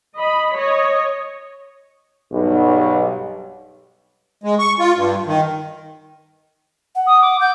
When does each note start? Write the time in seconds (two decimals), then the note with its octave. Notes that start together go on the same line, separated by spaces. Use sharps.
0.15 D#5 B5
0.55 C#5 D#5
2.32 B1 G2
4.44 G#3
4.59 C#6
4.79 F4
4.96 G2
5.27 D#3
6.95 F#5
7.07 D#6
7.22 D6
7.41 F#5 G6